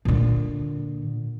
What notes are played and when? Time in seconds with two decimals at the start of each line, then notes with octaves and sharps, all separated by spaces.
0.05 A#2 D3